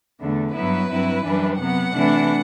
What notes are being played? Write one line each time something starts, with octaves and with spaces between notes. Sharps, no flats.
E2 D3 A3
G2 F#3 B3 E4 B4
G2 F#3 C4 E4
F#2 E3 G3 D4
C3 F#3 B3 F#5
C3 E3 A3 D4